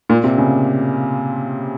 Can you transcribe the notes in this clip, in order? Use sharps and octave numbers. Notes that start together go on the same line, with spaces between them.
A#2
C3
C#3